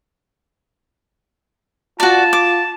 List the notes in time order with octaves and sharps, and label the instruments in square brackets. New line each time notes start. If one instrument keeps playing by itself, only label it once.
[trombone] F4 [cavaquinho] F#4 D5 [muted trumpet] A5
[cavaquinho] D6